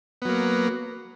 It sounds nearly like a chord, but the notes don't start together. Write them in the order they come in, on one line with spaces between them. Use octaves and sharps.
B3 F#3 A#3